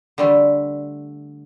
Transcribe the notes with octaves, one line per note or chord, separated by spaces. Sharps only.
D3 G3 A3